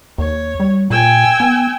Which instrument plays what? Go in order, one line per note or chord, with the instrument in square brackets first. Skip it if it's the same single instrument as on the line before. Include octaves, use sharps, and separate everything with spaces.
[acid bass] D#2 [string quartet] C#5
[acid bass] G3
[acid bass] A#2 [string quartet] G5 G#5 E6
[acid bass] B3